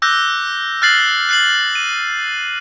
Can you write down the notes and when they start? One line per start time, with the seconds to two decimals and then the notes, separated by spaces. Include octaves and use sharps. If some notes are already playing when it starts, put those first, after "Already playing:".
0.02 D6 E6 F#6 G6 A#6
0.82 F6 F#6 A6 C7 F#7
1.29 F#6 C7 F#7
1.75 D#7